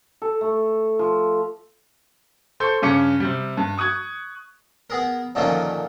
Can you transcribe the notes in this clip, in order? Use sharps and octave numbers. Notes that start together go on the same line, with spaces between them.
A4
A3
F3
A4 C5 C6 C#6 G6
G2 C#3 C#4 D6 C#7
C3 G3
G2
C#6 D#6 F#6 G#6
B3 G#4 A#4
F#2 A#2 D3 D#3 F3 C#4